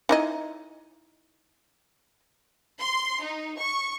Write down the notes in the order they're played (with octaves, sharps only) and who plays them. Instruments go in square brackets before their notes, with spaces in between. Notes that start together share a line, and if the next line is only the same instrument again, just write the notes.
[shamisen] D#4 E4 D#5
[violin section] C6
D#4
C#6